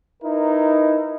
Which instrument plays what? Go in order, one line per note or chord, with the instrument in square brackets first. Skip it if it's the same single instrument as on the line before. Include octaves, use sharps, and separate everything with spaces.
[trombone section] D#4 E4 A#4 B4